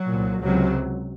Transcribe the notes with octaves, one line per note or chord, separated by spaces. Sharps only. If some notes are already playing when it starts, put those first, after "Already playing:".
Already playing: F#3
C2 A#2
C#2 C3 F#3